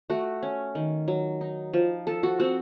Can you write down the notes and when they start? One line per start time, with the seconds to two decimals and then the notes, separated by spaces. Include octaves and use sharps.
0.10 A3 F#4
0.43 C#4
0.75 D#3
1.08 F#3
1.41 D#4
1.73 F3
2.07 F3 A4
2.23 F#4
2.40 C4 F#4